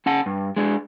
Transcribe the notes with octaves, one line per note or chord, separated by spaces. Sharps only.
C#4 F#5 A5
G2
G#3 D4